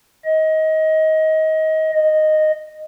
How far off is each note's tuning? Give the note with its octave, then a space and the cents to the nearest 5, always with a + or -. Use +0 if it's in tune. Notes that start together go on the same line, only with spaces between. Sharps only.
D#5 +25
D#5 -5